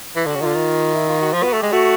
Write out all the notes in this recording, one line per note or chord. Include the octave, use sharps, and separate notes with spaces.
E3
D3 F#4
C#3
D3 D#3 F4
D#3
E4
F4
F#4
F3 F4
B3 F#4
A3
G#3 G4
A3 F#4